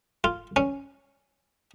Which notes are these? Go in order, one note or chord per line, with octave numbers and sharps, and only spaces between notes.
F4
C#4